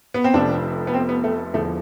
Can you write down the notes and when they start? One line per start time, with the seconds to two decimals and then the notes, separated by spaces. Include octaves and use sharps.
0.14 B3
0.24 C4
0.33 F1 F2 C3 F3 D4
0.87 B3
0.94 C4
1.09 B3
1.24 A3
1.54 E1 E2 D3 F3 A3